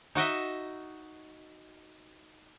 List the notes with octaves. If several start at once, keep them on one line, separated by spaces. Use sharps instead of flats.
D#4 F#4 D#5 E5